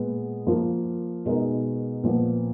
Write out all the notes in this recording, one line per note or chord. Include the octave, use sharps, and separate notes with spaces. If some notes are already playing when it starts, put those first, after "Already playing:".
Already playing: A#2 G#3 B3
F3 A#3 F4 A#4
B2 G#3 D#4 A#4
A#2 F3 B3